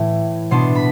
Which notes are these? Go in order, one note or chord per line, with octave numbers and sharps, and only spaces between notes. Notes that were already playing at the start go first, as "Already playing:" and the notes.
Already playing: A2 E3 A3 E4
B2 B3 D4 C6
B5